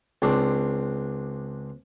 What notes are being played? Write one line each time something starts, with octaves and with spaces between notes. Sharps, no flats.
C#2 C4 D4